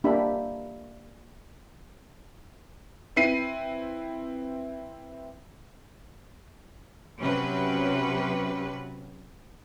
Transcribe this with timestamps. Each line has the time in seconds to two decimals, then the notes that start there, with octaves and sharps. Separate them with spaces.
0.04 A#3 D4 G4 E5 B5
3.16 C4 E4 B4 C7 D#7
7.19 C3 F#3 C#4 B4